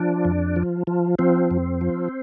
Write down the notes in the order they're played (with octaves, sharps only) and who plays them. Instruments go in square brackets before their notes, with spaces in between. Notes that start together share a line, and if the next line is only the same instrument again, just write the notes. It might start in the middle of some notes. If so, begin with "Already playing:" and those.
Already playing: [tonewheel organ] F3 D4
F2
F3
F3
F3 C4
F2
F3